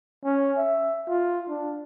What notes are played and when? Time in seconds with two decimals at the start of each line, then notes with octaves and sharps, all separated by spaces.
0.24 C#4
0.57 E5
1.08 F4
1.49 D4